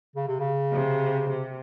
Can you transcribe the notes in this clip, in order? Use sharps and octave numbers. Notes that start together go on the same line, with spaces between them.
C#3
C3
C#3
C3
C3